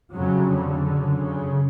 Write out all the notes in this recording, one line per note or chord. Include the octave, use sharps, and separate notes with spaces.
F2 C#3 F#3
D3
F#2 C#3
C#3